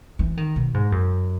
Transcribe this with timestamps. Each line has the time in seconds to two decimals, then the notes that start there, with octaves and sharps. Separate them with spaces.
0.19 E3
0.37 D#3
0.56 B2
0.74 G#2
0.92 F#2